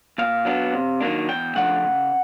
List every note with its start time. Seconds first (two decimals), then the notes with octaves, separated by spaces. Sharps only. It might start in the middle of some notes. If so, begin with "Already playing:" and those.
0.18 A#2 F5
0.45 F#3 B3 D4
0.74 C3
1.00 D#3 F#3 A#3 D4
1.28 E2 G5
1.55 C#3 F3 A3 D4 F#5
1.83 C#3